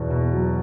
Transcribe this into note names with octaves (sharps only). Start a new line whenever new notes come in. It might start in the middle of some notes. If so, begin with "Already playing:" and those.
Already playing: E2 B2
B2
F#3